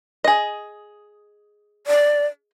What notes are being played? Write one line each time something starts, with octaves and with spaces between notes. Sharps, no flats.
G#4 D#5
D5